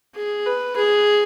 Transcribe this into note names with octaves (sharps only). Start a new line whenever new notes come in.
G#4
B4
G#4